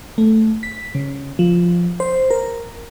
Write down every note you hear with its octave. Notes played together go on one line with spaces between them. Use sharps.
A3
B6
C#3
F3
C5
A#4